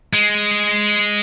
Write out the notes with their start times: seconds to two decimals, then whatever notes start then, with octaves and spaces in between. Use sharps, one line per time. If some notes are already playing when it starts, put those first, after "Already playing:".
0.13 G#3